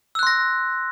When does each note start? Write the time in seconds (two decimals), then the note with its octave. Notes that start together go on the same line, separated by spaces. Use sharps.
0.15 E6
0.19 F#6
0.23 C6
0.27 A#6